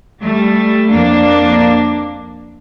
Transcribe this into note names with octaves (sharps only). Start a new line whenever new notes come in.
G3 A3
F2 A#3 D4